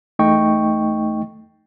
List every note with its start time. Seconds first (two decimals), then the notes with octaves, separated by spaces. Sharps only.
0.19 E2 A3 D#4 D#5 G5 C#6